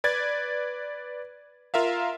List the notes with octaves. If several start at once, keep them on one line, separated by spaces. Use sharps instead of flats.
B4 D5 G#6 A6
F4 A#4 E5 F5